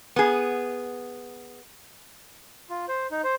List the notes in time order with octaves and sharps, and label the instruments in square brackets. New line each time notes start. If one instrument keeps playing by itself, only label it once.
[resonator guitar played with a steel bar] B3 G#4
[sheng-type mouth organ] F4
C5
D#4
C5